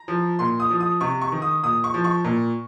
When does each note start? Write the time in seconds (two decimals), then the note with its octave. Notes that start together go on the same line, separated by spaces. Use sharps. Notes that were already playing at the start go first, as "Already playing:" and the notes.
Already playing: A#5
0.08 F3
0.39 A#2 C6
0.60 D#6
0.70 F3
0.80 D#6
1.01 C3 C#6
1.21 C#6
1.32 D#3
1.42 D#6
1.63 A#2 D#6
1.84 C#6
1.94 F3
2.04 C#6
2.24 A#2